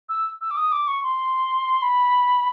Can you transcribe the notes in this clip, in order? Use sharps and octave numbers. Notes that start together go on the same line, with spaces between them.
E6
E6
D6
D#6
D6
C#6
C6
B5